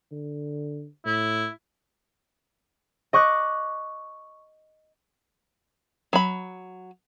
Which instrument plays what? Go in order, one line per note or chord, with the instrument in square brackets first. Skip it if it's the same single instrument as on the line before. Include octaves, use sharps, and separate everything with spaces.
[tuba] D3
[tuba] A2 [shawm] E4
[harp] D#5 C#6 D6 F#6
[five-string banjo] F#3 B5